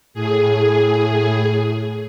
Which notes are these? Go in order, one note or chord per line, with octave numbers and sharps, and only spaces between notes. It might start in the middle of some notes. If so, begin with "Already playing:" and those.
A2 G#4